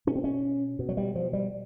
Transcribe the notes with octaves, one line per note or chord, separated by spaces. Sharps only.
B2 C#4
C4
C#4
B2
F#3
G3
F3
G3